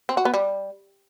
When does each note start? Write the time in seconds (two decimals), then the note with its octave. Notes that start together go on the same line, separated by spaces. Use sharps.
0.09 C4
0.17 F#4
0.25 B3
0.34 G3